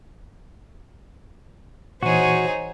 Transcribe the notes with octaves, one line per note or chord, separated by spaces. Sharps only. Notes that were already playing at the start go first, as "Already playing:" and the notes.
A#2 E3 D#4 F#4 G#4 C5 C#5